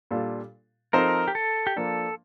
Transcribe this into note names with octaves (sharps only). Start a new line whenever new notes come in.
A#2 G3 D4 F4 A4
F3 C4 D#4 A4 A#4 C5
G4
A4
G4
F3 A#3 D4 A4